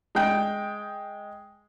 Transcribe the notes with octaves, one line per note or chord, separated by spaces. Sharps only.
G#3 G5